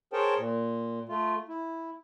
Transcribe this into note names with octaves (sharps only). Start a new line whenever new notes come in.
G#4 A#4 C5 C#5 G5 A5
A#2
A3 F4
E4